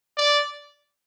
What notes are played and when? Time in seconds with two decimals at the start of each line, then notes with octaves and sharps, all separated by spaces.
0.18 D5